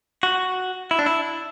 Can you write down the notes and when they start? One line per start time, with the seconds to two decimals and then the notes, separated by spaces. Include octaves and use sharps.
0.23 F#4
0.91 E4
0.99 D4
1.06 E4